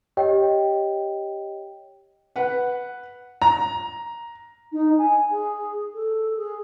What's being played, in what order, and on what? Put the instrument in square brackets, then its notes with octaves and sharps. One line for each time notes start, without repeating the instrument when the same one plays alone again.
[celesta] G4 C#5 D#5 G5
[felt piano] B4 F#5
[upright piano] A#5
[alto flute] D#4
G#5
G#4
A4
G#4